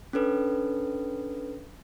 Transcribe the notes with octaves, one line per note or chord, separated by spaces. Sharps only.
C#4 D4 A4 B4